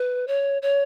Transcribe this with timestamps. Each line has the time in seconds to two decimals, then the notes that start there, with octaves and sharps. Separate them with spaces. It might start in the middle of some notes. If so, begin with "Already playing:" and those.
Already playing: B4
0.27 C#5
0.62 C#5